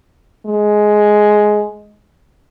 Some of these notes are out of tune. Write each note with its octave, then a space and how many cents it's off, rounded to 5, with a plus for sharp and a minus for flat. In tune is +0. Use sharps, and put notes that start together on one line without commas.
G#3 +10